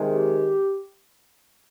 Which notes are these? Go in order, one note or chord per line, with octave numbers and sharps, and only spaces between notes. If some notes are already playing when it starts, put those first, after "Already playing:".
Already playing: C3 D#3 G#3
G4